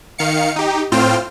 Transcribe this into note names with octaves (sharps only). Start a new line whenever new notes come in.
D#3 F5 C#7
D#4 G4
A2 C4 F4 C5 G5 F6